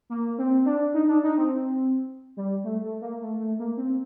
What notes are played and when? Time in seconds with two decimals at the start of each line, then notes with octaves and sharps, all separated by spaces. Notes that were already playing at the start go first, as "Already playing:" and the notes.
0.10 A#3
0.38 C4
0.66 D4
0.94 D#4
1.08 D4
1.23 D#4
1.38 C4
2.37 G3
2.64 A3
2.84 A3
3.02 A#3
3.22 A3
3.39 A3
3.59 A#3
3.77 C4